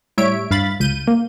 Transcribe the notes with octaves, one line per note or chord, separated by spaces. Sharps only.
A2 G3 C#5 E5 D7
G2 F5 B5 A6
C#2 G6 D#7
A#3